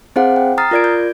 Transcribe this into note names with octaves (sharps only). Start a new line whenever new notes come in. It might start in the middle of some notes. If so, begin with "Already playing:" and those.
C4 E4 G#4 C5 F5 F#5
G5
A#5 D#6 F6 A6 C7
F4 A#4 D5 G#6 D7
G6